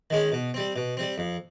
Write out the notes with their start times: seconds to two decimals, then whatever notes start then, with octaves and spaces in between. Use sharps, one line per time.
0.10 D#3 G#3 C#4
0.32 B2
0.54 G3 C4
0.76 B2
0.97 G3 C4
1.18 F2